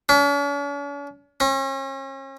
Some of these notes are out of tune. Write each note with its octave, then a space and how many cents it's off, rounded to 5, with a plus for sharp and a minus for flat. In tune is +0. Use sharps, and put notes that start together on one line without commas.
C#4 +45
C#4 -40